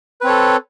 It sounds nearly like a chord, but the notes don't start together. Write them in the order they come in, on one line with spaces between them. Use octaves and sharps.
B4 C4 C#5 A4